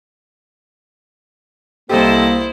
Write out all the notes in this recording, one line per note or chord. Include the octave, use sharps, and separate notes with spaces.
C2 A#3 C4 E4 G4 A4 C5 D#5